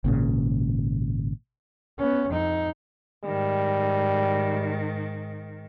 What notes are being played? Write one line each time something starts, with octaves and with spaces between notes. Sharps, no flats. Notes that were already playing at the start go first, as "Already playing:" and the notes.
G#1 A#2 C#3
B3 C#4
F2 D#4
G#2 D#3 G3